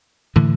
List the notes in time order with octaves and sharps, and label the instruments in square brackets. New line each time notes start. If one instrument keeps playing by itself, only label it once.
[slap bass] A2 D3 E3